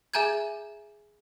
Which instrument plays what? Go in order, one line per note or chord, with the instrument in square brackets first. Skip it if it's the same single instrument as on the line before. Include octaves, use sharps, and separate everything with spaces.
[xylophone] G#4 E5 G#5 A#5 G6 G#6